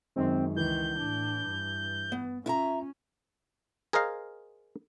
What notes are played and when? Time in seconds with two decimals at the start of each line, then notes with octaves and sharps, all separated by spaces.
0.16 F#2 D#3 G#3 C4
0.56 C#2 D#3 E3 G6
0.99 A2 D4
1.47 G2
2.12 B3
2.46 C#4 E4 F4 E5 A#5
3.93 G#4 A#4 C5 D#5 F5 A#5